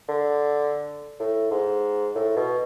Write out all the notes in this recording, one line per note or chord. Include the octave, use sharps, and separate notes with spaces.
D3
A2
G#2
A2
B2